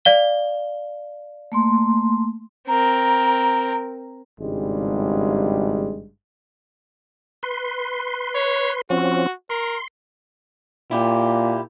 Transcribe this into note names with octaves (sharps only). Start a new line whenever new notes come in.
D5 F5 G7
A3 A#3 C6
C4 A#4 A#5
G#1 G2 C#3 G3 G#3
B4 C6
C#5
F3 C4 C#4 F#4
A#4 C6
A#2 E4 G4